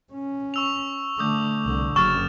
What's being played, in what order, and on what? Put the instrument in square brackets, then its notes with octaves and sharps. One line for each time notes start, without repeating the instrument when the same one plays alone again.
[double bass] C#4
[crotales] C#6 E6 F7
[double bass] D3 A3 [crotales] D6 D#6 G6
[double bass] C2 D3
[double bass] F#1 F#2 [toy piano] C#6 [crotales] F6 A6 E7